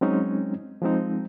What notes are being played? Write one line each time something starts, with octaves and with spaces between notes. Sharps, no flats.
F#3 G#3 C4 C#4 D#4
F3 G#3 C4 D#4